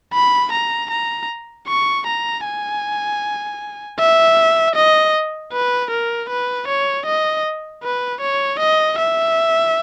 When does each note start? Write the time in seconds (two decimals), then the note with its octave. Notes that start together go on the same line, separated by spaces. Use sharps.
0.14 B5
0.52 A#5
0.91 A#5
1.67 C#6
2.07 A#5
2.45 G#5
3.99 E5
4.75 D#5
5.52 B4
5.91 A#4
6.29 B4
6.68 C#5
7.06 D#5
7.83 B4
8.21 C#5
8.59 D#5
8.98 E5